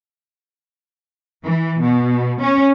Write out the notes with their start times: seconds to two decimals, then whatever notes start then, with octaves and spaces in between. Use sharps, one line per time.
1.43 E3
1.84 B2
2.42 C#4